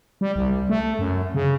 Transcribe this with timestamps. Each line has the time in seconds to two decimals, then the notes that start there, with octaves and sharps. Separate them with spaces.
0.21 G3
0.36 C2
0.69 A3
0.99 F#2
1.35 C#3